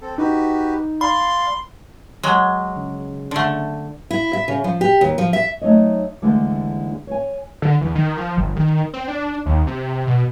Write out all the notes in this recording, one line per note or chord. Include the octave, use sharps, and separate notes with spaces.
C4 A4
D#4 F#4 G4 B4
D5 F5 B5 C6
F#3 G#3
C#3
D3 A3
E4
E5
C#3
F3
G4
D#2
F3
E5
F#3 A3 D#4 C#5 D#5
D#2 D3 E3 G#3 A3
C#5 G#5
D3
E2
D#3
F3
G1
D#3
C4
D4
D#2
C3
B2